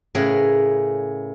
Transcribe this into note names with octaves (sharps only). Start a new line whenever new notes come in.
A2 C#3 G#4 A#4 B4